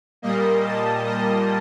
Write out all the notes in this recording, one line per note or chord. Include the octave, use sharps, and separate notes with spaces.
A#2 G3 A#3 D#5
A5
D#5